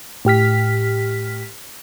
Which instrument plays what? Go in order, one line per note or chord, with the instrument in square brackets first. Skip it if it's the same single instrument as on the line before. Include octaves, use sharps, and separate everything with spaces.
[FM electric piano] A2 G4 F6 B6